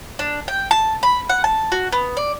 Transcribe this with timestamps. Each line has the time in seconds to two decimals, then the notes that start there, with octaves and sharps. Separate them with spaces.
0.19 D4
0.48 G5
0.71 A5
1.03 B5
1.29 F#5
1.44 A5
1.72 F#4
1.93 B3
2.17 D5